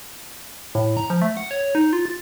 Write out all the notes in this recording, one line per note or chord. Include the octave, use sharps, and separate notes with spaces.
A2
A#5
F3
A3
F#5
C#5
D#4
F4
A6